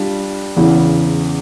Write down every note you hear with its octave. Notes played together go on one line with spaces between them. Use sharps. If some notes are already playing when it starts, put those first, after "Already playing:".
Already playing: G3 D4 F4
E2 C#3 E3